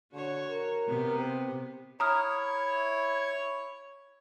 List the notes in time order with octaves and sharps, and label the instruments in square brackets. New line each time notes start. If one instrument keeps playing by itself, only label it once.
[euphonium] D3 [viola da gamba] F#4 C#5
[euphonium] A#4
[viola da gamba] C3 B3
[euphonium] C4
[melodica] E4 [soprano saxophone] C#5 [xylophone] A#5 D#6 F6